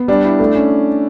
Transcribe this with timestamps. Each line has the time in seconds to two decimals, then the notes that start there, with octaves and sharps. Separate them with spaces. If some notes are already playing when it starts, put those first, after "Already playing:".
Already playing: B3
0.08 G3 D4
0.25 E4
0.39 A3
0.55 C#4